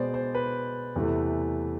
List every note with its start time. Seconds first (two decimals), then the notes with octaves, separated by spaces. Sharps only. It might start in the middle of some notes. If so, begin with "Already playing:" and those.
Already playing: B2 G#3 B3 C5 D5
0.14 C5
0.35 B4
0.96 E2 C3 E3 A3